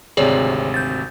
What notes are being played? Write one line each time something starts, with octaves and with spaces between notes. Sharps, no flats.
G#1 D2 C3 G#4 C#5 D5
G6 A6